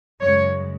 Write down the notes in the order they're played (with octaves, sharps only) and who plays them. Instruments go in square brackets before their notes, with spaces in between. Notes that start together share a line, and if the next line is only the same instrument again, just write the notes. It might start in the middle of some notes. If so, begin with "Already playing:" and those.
[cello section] F#2 C#3 G#3 C#5